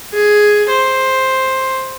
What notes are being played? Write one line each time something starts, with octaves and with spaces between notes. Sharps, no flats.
G#4
C5